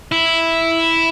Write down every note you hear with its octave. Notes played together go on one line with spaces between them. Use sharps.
E4